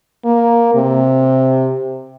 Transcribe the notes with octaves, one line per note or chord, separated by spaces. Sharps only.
A#3
C3